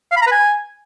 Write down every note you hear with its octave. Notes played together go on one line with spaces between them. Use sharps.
F5
B5
A#5
B4
G#5